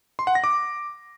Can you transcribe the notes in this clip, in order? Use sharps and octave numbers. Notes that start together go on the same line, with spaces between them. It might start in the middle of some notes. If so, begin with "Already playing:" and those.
C6
F#5
A#6
D6